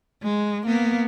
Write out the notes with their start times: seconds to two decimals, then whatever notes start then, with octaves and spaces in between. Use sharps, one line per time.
0.23 G#3
0.66 A#3 B3